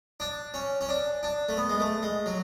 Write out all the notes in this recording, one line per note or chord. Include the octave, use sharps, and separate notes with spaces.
D4
C#4
C#4
D4
D4
A3
B3
G#3
A3
G#3
F#3